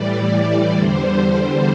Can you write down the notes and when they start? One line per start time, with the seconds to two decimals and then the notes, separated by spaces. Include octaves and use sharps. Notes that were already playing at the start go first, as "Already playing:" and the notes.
Already playing: A2 E3 G3 D5
0.32 D5
0.76 E2 D3 G3 C5